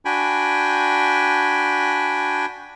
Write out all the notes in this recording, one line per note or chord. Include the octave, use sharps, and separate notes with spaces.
D4 F#4 G5 G#5 B5